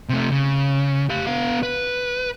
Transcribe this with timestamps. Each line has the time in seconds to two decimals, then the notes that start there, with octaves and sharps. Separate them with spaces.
0.09 C3 A3
0.31 C#3
1.10 G4 F5
1.27 B3 F5
1.63 B4